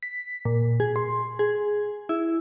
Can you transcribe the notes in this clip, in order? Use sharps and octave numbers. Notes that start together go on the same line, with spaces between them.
B6
A#2
G#4
C6
G#4
E4